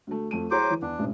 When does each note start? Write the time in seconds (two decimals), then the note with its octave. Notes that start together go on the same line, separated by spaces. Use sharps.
0.07 D2 A3
0.31 F2 A3 D#7
0.51 F#3 E4 G#4 C5 C#5 D6
0.70 E3
0.82 E2 D4
0.99 E1 A1